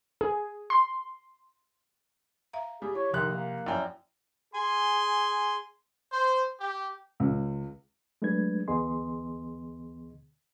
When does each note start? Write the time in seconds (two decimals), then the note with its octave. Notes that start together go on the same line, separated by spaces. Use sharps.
0.21 G#4
0.70 C6
2.53 E5 F5 A#5
2.82 G3 G#4
2.95 E4 C#5
3.13 C2 D#3 F3 C6 F#6
3.32 A#3
3.66 F#2 E4 D5 G5
4.54 G#4 G#5 C6
6.12 C5
6.61 G4
7.20 C#2
8.22 F#3 G#3 A3 D4 B4 G#6
8.68 D2 E3 B3 G#4 D#5 C6